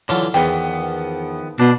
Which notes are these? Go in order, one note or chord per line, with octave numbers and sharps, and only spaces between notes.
D3 E3 F#3 F4 A4
E2 D#3 F3 B3 G5 C6
B2 D4